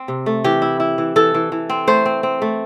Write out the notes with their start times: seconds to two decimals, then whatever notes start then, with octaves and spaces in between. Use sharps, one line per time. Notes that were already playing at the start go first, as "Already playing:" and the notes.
Already playing: C4
0.08 C3
0.26 A3
0.44 E3 G4
0.62 E4
0.80 E4
0.98 E3
1.16 E3 A4
1.34 E3
1.52 E3
1.70 C4
1.88 A3 C5
2.06 C4
2.23 C4
2.42 A3